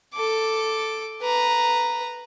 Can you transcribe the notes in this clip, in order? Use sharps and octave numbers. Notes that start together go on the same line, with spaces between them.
A4 D6
B4 A#5